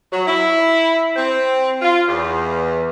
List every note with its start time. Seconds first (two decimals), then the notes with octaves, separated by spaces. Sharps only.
0.13 F#3
0.26 E4
1.16 C4
1.82 F4
2.09 E2